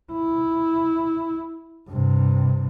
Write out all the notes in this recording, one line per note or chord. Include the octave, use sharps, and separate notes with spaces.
E4
G2 C3